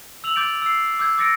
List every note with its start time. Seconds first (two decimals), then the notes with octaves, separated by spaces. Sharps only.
0.24 E6 F7 F#7
0.36 D6 G6 A6 D7
0.62 E6 C7
0.99 D6 E6 G6 G#6
1.18 D6 E6 A6 A#6 C#7 D7